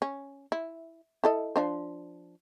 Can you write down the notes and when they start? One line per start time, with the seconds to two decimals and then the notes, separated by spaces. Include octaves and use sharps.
0.02 C#4
0.52 E4
1.24 E4 A4 D#5
1.56 F3 D4 C5